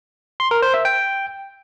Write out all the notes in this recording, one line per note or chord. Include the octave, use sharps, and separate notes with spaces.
C6
A#4
C5
E5
G5